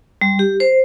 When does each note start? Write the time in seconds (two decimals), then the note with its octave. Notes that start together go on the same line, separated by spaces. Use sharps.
0.21 G3
0.39 G4
0.60 C5